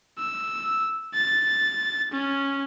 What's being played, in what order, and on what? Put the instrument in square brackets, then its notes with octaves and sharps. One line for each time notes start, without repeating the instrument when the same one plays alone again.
[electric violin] E6
A6
C#4